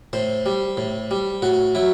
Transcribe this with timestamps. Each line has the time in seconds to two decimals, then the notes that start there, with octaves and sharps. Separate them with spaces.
0.13 A2 C5
0.46 G3
0.77 A2
1.11 G3
1.42 A2 F#4
1.75 F#3 E4